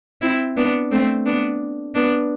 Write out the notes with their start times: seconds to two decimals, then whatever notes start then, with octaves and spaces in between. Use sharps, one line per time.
0.21 C4 E4
0.57 B3 D4
0.91 A3 C4
1.26 B3 D4
1.95 B3 D4